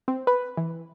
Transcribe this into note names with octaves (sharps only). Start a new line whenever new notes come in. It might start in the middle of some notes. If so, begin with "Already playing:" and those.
C4
B4
E3